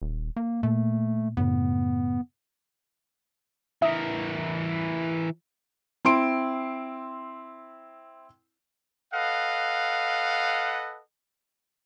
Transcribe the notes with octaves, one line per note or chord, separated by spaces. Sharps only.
D#1
A#3
A#2 A3
F#2 A2 C#3 B3
E3 A#4 E5 D#6
C4 E4 C6 D7
A4 B4 D#5 F5 F#5